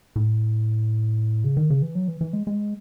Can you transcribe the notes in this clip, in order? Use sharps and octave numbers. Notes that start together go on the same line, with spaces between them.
A2
C#3
D#3
C#3
E3
F#3
E3
E3
G#3
G#3